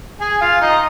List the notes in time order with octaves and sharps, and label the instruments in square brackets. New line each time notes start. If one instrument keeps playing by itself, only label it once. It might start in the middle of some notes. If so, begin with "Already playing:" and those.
[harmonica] G#4 G#5
F4 F5
D#4 D#5